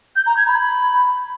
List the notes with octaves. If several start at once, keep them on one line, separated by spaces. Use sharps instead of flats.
G6
A#5
G#6
B5